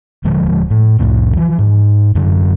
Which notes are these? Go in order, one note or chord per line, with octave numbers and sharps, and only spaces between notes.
D#1 D3 F3 G#3
A2
C2 F2 A2 C3
E3 F3
G#2
F#2 D3 F#3